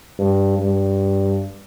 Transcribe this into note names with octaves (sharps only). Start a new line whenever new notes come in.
G2
G2